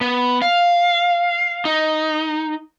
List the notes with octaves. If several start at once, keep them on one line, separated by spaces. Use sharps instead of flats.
B3
F5
D#4